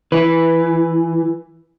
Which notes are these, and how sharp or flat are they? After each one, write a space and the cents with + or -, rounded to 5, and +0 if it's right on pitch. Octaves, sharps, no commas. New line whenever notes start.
E3 +5 B4 +0